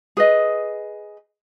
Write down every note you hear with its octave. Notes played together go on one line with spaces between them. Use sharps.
G#4 B4 D#5